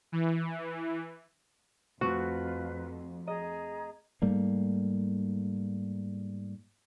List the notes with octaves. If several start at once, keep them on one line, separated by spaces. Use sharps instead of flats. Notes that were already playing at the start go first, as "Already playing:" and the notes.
E3
F2 A3 C4 F4 F#4 B4
G#4 D#5 A#5
G#2 G3 A3 A#3